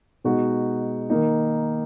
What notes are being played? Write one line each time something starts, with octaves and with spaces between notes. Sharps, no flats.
B2 G#3 D#4 F#4
D#3 A#3 D#4